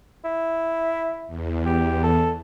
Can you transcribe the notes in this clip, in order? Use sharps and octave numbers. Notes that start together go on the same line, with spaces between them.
E4
E2
G4
A4